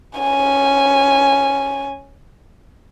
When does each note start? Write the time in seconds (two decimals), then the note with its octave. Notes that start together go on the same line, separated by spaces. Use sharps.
0.19 C#4 G#5